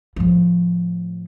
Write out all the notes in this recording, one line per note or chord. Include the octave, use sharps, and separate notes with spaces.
A2 F3